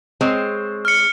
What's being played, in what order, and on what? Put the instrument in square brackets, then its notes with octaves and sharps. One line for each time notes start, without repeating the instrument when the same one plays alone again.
[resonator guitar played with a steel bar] G#3 C4 C#5
[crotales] F6 C#7